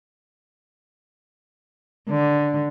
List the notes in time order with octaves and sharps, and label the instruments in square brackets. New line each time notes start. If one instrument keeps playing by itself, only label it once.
[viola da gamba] D3